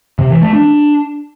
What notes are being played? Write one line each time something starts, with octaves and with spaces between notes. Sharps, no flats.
C3
E3
A3
D4